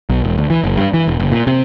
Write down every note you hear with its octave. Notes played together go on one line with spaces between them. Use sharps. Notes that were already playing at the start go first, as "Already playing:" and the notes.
B1
E1
D2
E3
F#1
G2
E3
E1
F#1
A#2
C3